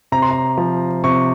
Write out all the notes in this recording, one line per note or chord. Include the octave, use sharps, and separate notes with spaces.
C3 A#5
C6
A#5
F3
C3 C#6